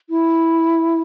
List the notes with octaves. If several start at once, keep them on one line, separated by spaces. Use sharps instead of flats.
E4